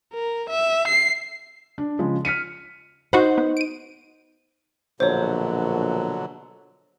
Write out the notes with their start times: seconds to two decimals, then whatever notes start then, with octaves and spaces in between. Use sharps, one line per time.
0.13 A#4
0.49 E5
0.88 C7
1.78 D4
1.99 C#3 F3 G#3
2.25 F6 B6 C#7 D#7
3.13 D#4 F#4 C5 F#5 B5
3.38 B3
3.57 D7 D#7
5.00 A#1 B2 D3 F#3 C5 C#5